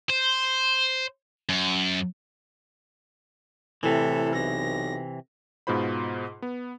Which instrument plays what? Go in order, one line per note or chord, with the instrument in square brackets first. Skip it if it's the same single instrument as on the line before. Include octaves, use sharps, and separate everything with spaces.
[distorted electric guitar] C5
F#2
[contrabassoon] A2 [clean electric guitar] C3 E3 [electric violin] A4
[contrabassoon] B1 [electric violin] A#6
[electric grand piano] G#2 B2 F4 C5 B5
B3